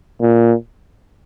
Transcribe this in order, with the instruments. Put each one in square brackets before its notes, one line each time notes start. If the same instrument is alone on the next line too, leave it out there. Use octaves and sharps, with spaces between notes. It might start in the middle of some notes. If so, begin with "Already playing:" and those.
[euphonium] A#2